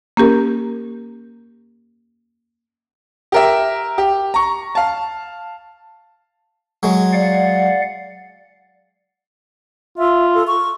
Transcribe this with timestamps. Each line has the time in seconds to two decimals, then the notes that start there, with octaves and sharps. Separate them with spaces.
0.17 A#3 C#4 G4 A#4
3.32 G4 A#4 E5
3.98 G4
4.34 A#5 C#6
4.75 F5 A5
6.83 F#3 G#3
7.13 D5 F5 F#5
9.98 F4 E5
10.35 A4
10.47 C#6